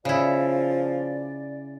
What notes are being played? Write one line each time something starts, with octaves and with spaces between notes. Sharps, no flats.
C#3 F3 E4 D5